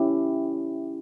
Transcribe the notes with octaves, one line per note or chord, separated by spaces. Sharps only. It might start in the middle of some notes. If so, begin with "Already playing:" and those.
Already playing: C#4 E4 G4